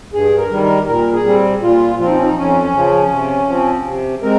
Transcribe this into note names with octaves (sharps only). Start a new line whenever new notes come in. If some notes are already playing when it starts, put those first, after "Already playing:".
G2 G#4
A#4
D#3 G3
A#4
A#2 A#4
G#4
G3 C4
A#2 F4
F3 C4 F4
D#4
C#4
D#4
F2 C#4
C#3 F3
C3
F3 C4
C3
G#3 C4 A#4